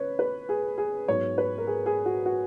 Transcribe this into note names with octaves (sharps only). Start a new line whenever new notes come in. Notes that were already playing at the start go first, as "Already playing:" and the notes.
Already playing: C#3 B4 C#5
B4
G#4
G#4
G#2 F#3 B3 C#5
B4
A#4
G#4
G#4
F#4
F#4